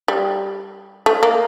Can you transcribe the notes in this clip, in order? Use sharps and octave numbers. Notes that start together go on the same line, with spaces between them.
G3
A3
A#3